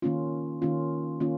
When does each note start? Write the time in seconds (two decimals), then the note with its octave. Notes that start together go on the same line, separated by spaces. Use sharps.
0.02 D#3 A#3 C#4 F4
0.62 D#3 A#3 C#4 F4
1.20 D#3 A#3 C#4 F4